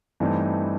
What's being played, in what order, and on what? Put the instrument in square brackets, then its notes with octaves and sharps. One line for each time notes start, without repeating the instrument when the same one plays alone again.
[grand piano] G2 E3 A3 C4 D#4